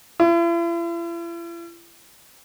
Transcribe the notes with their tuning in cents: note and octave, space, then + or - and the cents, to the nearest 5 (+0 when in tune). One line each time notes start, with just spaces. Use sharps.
E4 +45